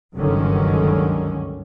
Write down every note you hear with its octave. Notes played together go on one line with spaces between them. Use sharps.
F#1 C#2 G2 D3 D#3 C#4